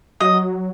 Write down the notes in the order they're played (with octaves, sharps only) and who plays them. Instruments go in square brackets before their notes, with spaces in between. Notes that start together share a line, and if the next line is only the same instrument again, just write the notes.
[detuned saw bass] F#3 [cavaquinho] D#5